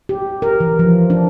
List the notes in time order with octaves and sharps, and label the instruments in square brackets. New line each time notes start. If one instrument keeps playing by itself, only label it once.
[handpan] G4
A#4
E3
F3
D4